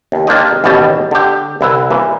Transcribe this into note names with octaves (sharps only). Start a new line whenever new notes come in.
D#2
A#3 D4 F4 G4 D5 D#5
A1 D#2 B2 G3 A5
D3 G4
C2 E4 B4 E5
A#2 E3